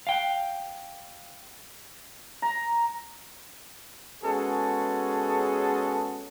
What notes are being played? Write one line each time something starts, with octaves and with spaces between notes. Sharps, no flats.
F5 G5
A#5
G#3 B3 C#4 F#4 G#4 A4